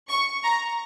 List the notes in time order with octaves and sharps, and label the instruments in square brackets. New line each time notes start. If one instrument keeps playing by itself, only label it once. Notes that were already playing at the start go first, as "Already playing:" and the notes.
[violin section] C#6
A#5